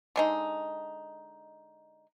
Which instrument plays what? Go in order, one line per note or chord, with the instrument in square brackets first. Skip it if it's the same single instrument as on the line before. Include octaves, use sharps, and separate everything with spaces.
[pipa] D3 G#3 D#4